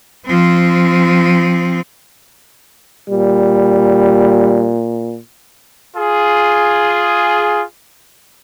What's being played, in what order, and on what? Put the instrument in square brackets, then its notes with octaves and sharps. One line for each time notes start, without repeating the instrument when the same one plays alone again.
[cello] F3 C4
[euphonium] A#2 [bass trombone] G3
[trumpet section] F4 G#4